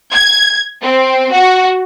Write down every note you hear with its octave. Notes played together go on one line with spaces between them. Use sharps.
G#6
C4
F#4